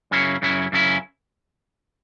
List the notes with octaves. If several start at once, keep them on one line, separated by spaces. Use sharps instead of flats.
F#2 C#3 F#3 C#4 E4
F#2 C#3 F#3 C#4 E4
F#2 C#3 F#3 C#4 E4